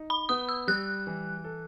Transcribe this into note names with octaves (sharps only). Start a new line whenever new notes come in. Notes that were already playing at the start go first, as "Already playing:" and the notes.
Already playing: D#4
B5
B3 D#6
E6
G3 F#6
E3
A4